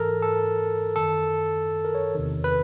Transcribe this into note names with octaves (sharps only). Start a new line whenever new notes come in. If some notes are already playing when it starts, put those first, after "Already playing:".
Already playing: G#2 E3 A4 A#4
A4
F#2 D#3 A4
A#4
C#5
E2 C3 D#3
B4